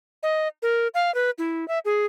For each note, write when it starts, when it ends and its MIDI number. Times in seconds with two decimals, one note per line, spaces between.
0.23 0.48 75
0.62 0.88 70
0.94 1.13 77
1.14 1.30 71
1.38 1.67 64
1.68 1.79 76
1.85 2.06 68